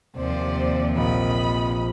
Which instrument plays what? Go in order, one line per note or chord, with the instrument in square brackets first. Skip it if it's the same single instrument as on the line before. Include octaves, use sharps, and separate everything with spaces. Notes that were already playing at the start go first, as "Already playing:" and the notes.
[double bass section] D#2 [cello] C3 F3 [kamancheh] C5 D5
[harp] A#1 [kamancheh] D#5 B5